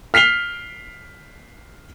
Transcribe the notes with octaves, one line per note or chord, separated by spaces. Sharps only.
F6 B6 C7 F7 G7